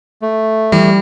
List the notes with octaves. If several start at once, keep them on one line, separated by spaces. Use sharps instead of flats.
A3
E3 G3